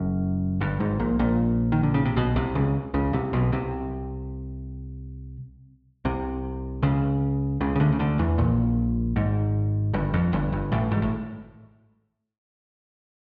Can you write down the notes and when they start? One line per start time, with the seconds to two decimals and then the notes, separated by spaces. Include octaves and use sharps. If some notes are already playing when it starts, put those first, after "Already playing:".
Already playing: F#1 F#2
0.61 G1 G2
0.80 G#1 G#2
0.99 A#1 A#2
1.19 A#1 A#2
1.72 D#3
1.83 D3
1.94 C#3
2.05 C3
2.16 B1 B2
2.36 C2 C3
2.55 C#2 C#3
2.94 C#2 C#3
3.13 C2 C3
3.33 B1 B2
3.52 C2 C3
6.05 C2 C3
6.83 C#2 C#3
7.61 C#2 C#3
7.76 C#3
7.80 D2 D3
7.92 C#3
7.99 D2 D3
8.19 E2 E3
8.38 A#1 A#2
9.16 G#1 G#2
9.94 G1 G2
10.14 F2
10.33 G1 G2
10.52 G1 G2
10.72 A1 A2
10.91 G#1 G#2
11.02 A2